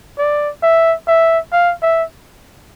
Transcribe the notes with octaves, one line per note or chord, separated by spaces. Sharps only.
D5
E5
E5
F5
E5